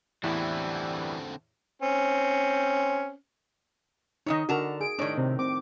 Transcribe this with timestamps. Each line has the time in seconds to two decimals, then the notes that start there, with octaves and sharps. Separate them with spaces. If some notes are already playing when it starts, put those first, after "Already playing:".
0.24 E2 A2 D3 E3 G3 C4 E4
1.82 C4 C#4
4.26 D#3 E3 D#4 C#5 D#5
4.49 D3 F#4 A#4 A5 A#5
4.81 G#4 D7
4.99 A2 D#3 D4 C#5
5.17 C3
5.39 C4 D6